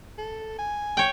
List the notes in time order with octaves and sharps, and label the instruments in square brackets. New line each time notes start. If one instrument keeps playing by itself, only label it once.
[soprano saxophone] A4
G#5
[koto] C#5 G5